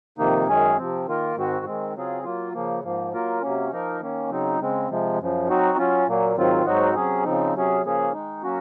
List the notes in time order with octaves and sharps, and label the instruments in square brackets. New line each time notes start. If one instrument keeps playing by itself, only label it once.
[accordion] F2 C3 D#3 A#3 D#4
F#2 D#3 G#3 C#4 G#4
C3 F3 C4
D#3 A#3 F4 A#4
G#2 D#3 G#3 C4 F#4
D#3 G#3 C4
C#3 F#3 C4 F4 G#4
F#3 A#3 F4
C#3 F3 A#3
G#2 F3 A#3
F#3 A#3 F4 A#4
C3 F#3 A#3 C#4
F3 A#3 D#4 A#4
D#3 A#3 C#4
C#3 F#3 C4 D#4
C#3 G#3 C4
C3 F3 G#3
F#2 C#3 F3
F#3 C4 D#4 F#4
F#3 C#4 F4
A#2 F#3 A#3
G#2 D#3 F#3 C4 F4
G#2 F#3 C4 D#4 F#4
C3 F#3 C#4 G#4
C#3 F3 C4 D#4
C3 F#3 C#4 G#4
C#3 F3 A#3 C#4 G#4
D#3 G#3 D#4
F#3 A#3 C#4 F#4